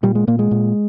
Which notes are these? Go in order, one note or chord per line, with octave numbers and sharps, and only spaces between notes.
A#2 G3
G#3
A#2 A#3
G#3
A#2